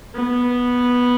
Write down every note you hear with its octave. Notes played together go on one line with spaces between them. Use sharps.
B3